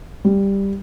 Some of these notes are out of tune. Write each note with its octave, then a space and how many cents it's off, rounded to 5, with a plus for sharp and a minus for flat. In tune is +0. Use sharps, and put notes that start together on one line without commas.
G3 +5